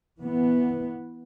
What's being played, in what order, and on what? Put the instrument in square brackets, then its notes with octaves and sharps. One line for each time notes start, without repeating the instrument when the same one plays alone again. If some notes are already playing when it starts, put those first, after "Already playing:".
[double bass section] E3 B3